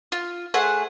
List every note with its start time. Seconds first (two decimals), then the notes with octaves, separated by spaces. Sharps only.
0.12 F4
0.54 A3 G#4 C5 F#5